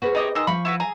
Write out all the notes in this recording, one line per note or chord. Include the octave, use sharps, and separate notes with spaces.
F#4 G#4 B4 C5
C3 D#4 G4 C#5 D#5
D#3 G#3 D#5 E6
F3 F5 B5 C#6
E4 F#4 B4
G#4 A#5